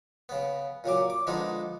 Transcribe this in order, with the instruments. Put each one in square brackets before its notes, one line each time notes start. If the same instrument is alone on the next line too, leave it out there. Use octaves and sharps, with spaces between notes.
[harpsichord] C#3 B3
A#2 C#3 F#3 D6
D6
D3 F3 G#3 B3 D#4